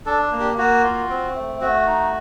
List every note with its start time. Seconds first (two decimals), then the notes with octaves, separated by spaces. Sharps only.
0.06 D4 A4
0.32 A#3
0.40 G4
0.58 A#3 F#4
0.84 F4
1.10 C4
1.35 A3
1.61 A3 F#4
1.86 D#4